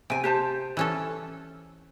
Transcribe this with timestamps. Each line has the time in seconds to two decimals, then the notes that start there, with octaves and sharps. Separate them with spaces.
0.10 C3 G5 G#5
0.24 G4 C5 A5
0.77 E3 C#4 A4